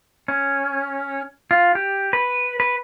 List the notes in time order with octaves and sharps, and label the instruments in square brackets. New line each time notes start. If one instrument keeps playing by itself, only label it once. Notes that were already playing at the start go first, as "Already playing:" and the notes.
[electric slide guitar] C#4
F4
G4
B4
B4